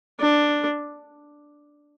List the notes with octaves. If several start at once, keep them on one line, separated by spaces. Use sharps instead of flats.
D4